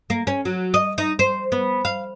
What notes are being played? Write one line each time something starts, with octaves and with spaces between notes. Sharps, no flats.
A#3
C#4
F#3
D#5
D#4
C5
B3
F5